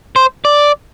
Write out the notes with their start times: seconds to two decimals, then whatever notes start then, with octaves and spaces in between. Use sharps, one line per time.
0.16 C5
0.45 D5